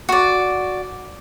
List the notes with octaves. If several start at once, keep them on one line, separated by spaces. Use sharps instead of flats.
F#4 D5